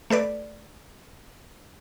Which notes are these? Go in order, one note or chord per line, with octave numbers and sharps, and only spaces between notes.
A3 A4 B4 D5